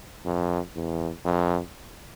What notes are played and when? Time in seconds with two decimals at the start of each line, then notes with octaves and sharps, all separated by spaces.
0.25 F2
0.76 E2
1.25 F2